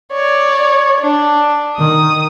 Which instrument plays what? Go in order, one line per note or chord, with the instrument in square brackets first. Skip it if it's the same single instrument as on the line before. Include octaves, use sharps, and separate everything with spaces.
[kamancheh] C#5 D5
D4
[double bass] D#3 [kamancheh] D#6